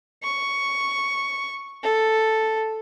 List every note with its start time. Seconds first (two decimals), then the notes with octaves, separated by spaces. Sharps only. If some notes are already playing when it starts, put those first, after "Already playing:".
0.23 C#6
1.83 A4